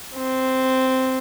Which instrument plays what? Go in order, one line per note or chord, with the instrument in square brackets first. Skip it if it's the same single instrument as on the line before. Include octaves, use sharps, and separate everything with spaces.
[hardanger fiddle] C4